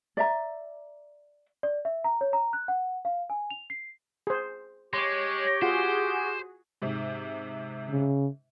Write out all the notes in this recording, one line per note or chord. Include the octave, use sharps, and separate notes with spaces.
D5 E5 A#5
D5
E5
A#5
C#5
A#5
F#6
F#5
F5
G#5
F7
C7
G#4 C5
G#3 G4 C#5 C6 D6
F4 F#4 G#4 C5 F#5
G#2 C3
C#3